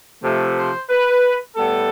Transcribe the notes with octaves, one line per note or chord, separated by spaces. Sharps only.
C3 F3 A3
C5
B4
A2 G3 B3 A4